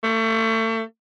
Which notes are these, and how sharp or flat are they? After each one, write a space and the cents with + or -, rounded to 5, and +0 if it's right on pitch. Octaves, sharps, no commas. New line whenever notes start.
A3 +35